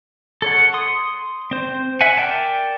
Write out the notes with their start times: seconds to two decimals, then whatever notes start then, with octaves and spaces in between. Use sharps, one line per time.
0.42 A4 C#5 F#5
0.74 C6 D#6
1.51 C4 C5
2.01 E5 F#5 G#5
2.17 A#4 D5 G5 A5